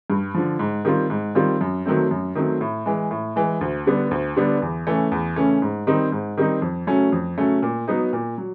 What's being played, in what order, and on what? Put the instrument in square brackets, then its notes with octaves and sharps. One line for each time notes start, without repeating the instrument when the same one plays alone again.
[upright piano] G2
D3 F3
G#2
D#3 G3 C4 F4
G#2
D#3 G3 C4 F4
F#2
D#3 F#3 A3 C4
F#2
D#3 F#3 A3 C4
A2
E3 G#3
A2
E3 G#3
D2
D3 G3 B3 D4
D2
D3 G3 B3 D4
E2
C#3 E3 A3 C#4
E2
C#3 E3 A3 C#4
G#2
D#3 G3 C4 D#4
G#2
D#3 G3 C4 D#4
F2
C#3 F#3 A3 C#4
F2
C#3 F#3 A3 C#4
A#2
F#3 B3 D#4
A#2
F#3